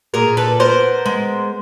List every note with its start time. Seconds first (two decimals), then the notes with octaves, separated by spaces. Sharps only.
0.14 A#2 G#4 A#4
0.37 A4 B4
0.60 B3 A#4 C5
1.06 G#3